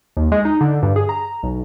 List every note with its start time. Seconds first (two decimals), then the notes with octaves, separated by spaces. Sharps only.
0.17 D#2
0.32 G#3
0.45 D#4
0.61 D3
0.83 G2
0.96 G#4
1.09 A#5
1.43 B1